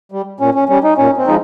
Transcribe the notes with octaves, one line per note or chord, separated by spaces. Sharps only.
G3
A#2 C#4
C#4
G3 C#4
D#4
A#2 C#4
C4
F3 G#3 D#4